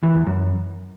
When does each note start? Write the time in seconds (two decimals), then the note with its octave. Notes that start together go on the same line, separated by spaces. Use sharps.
0.03 E3
0.15 E2
0.27 F#2